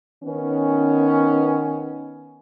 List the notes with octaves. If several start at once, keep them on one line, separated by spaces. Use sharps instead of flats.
D#3 B3 C#4